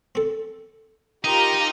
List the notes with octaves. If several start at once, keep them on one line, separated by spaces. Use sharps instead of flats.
C4 A4
D#4 F4 G4 A#4